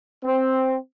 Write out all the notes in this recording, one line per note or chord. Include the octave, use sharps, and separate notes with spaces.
C4